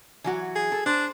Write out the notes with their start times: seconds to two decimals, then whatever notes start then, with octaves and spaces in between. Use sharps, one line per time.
0.24 E3 F#3 F#4
0.55 G#4
0.72 A4
0.86 D4 C5